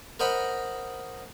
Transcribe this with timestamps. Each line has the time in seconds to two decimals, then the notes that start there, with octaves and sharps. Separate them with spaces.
0.20 A#4 C5 D#5 F#5 B5